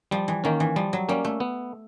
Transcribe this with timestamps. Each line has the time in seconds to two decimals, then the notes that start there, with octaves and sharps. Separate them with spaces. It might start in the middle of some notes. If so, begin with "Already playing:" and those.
0.11 F3 G3
0.28 E3
0.44 D#3 A#3 C#4
0.60 E3
0.76 F3 G3
0.93 F#3
1.09 G3 A#3 C#4
1.25 A3
1.40 B3